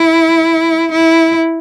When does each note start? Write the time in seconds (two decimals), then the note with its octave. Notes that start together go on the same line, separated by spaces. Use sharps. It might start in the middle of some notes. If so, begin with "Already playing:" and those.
Already playing: E4
0.92 E4